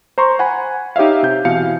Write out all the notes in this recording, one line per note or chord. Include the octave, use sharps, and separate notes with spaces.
C5 A#5 C6 C#6
F#5 G#5 B5
D#4 G4 C#5 E5 F5
C3 G6
B2 E3 F5 C#7